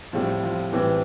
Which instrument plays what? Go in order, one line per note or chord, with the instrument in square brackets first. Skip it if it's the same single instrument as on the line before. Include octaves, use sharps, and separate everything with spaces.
[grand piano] A2 G3 C4 [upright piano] F3
[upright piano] F3
[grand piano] A2 G3 C4 [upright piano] E3